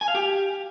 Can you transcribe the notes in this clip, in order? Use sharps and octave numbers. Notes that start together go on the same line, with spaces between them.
G#5
F5
G4